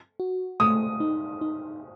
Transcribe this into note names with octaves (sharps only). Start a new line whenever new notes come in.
F#4
A3 D#6
D#4
D#4